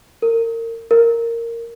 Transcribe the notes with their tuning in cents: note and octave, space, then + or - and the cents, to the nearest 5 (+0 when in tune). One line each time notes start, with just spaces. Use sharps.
A#4 -30
A#4 -10